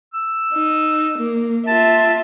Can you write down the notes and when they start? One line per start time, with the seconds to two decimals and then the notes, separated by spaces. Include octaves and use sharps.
0.13 E6
0.53 D#4
1.18 A#3
1.67 F4 E5 A5